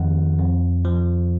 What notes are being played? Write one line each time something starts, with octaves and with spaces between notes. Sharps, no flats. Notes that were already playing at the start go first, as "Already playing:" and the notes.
Already playing: F2 D#3 F#5
F2
F3